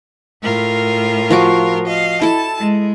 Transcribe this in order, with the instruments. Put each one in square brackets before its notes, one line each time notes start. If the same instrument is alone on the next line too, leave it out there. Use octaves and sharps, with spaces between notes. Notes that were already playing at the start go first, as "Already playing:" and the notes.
[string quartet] A2 F4 A#4
[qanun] F3 F#4 D6
[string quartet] D#5 F5
[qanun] E4 A4 [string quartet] A5
[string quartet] G#3